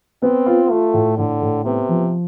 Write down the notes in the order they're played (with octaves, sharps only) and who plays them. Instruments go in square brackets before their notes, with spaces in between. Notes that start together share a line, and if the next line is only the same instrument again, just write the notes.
[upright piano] B3 [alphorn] C4
[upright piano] F4
[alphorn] A3 [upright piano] F4
[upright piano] A2
[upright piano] A2 [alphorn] D3
[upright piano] A2
[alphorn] C3 [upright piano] B3
[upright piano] F3